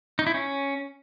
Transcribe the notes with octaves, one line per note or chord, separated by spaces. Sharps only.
D#4
E4
C#4